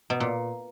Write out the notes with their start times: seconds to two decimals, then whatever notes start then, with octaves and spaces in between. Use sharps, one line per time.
0.10 B2
0.20 A#2